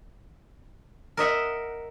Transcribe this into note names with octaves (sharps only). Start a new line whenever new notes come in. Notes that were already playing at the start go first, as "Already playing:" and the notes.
A#4 D#5 E5 F#5